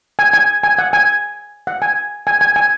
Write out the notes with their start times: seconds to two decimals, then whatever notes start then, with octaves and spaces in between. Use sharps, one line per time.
0.19 G#5
0.33 G#5
0.64 G#5
0.79 F#5
0.93 G#5
1.67 F#5
1.82 G#5
2.27 G#5
2.41 G#5
2.56 G#5